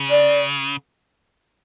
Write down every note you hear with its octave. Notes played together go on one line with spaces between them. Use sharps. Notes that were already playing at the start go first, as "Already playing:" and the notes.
Already playing: C#3
D5